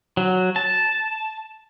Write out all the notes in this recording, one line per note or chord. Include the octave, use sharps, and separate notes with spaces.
F#3
A5